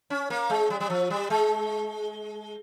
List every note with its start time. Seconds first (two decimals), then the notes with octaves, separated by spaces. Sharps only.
0.10 C#4
0.30 A#3
0.50 G#3
0.70 G3
0.80 G3
0.90 F3
1.10 G3
1.30 G#3